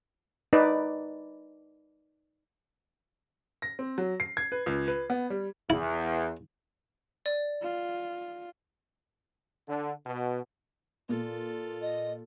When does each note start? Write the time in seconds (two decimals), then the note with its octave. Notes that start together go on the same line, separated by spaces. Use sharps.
0.53 D#4 B4 D5
3.62 A#6
3.79 C4
3.98 F#3
4.20 C7
4.37 G#6
4.52 B4
4.66 C#2
4.88 B4
5.10 B3
5.30 G3
5.70 E2 E4
7.26 D5
7.62 F4
9.68 D3
10.06 B2
11.09 A#2 F4 A4
11.82 D#5